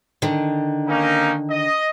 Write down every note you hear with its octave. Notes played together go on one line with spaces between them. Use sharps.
D3 D#3
A#3 C#4 D#4
D#5